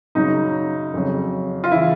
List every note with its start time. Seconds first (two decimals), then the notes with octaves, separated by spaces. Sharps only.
0.15 F#2 C#3 F#3 D#4
0.94 F2 C#3 F#3
1.64 F4
1.71 C#3 E3 E4